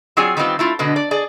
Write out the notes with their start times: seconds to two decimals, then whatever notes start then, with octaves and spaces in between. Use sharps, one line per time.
0.17 F#3 C4 F4 G#4 D5 G#5
0.37 D#3 G3 B3 C4 F4
0.59 A3 E4 F4
0.79 B2 D3 G#3 B3
0.96 D5
1.11 G#4 D5